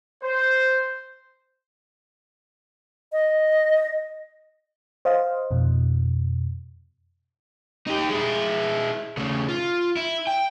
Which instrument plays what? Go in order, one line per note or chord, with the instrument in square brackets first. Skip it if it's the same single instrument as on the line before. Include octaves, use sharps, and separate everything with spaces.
[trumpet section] C5
[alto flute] D#5
[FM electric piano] C5 D#5 F5
F2 B2
[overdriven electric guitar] D#4 G4
G#3 E4
C#3 A3
F4
E4
G5